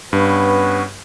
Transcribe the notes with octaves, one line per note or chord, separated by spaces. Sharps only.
G2 B3 C#4 B4